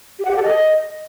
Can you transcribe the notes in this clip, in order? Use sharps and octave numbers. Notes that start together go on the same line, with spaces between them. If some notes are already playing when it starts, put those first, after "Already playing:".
G4
F#5
G4
A4
D#5